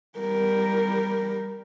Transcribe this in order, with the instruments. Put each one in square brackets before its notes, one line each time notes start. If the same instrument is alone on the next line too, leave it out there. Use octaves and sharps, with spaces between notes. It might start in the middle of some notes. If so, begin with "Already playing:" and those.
[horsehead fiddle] G3 A#4